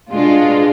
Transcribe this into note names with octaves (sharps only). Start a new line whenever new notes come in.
B2 G#3 D4 F4